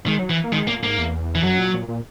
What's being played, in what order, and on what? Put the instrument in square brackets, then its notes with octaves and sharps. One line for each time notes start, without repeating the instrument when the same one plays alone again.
[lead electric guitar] D#3 [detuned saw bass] G#3
[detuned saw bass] F#3
[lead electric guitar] E3
[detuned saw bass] A#3
[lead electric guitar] D#3 [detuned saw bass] G#3
[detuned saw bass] A#2 [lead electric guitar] A#3
[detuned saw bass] G#2 [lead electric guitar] A#3
[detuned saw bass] E2
[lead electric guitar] E3
[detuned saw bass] F#2 [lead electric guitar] F#3
[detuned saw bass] A#2
A#2
A#2